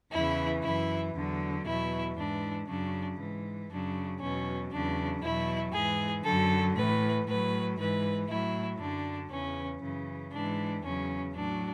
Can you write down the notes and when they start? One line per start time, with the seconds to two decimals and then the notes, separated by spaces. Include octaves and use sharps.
0.13 E2 C#3 E3 E4
0.64 F#2 E3 E4
1.15 E2 D3 F#3
1.66 E2 B2 F#3 E4
2.17 G#2 E3 D4
2.68 F#2 C#3 F#3 D4
3.19 G#2 E3
3.70 F#2 C#3 F#3 D4
4.21 E2 B2 F#3 C#4
4.72 E2 C#3 F#3 D4
5.22 E2 B2 F#3 E4
5.73 G#2 E3 G#4
6.25 F#2 D3 F#3 A4
6.75 A2 E3 B4
7.27 A2 F#3 B4
7.78 G#2 E3 B4
8.28 A2 F#3 E4
8.79 F#2 D3 F#3 D4
9.31 E2 C#3 E3 C#4
9.81 F#2 C#3 E3
10.32 G#2 E3 D4
10.83 E2 C#3 F#3 C#4
11.34 A2 F#3 D4